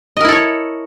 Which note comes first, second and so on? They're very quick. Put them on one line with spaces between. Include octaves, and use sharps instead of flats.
D#5 A#4 E4 A4 C#5